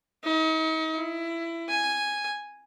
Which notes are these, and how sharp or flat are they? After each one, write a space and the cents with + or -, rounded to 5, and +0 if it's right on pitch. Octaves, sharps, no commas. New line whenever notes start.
D#4 +40
E4 +20
G#5 -5